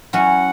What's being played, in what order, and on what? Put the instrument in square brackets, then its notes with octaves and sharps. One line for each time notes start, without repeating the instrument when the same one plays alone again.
[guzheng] F#3 C#4 E4 [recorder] F#5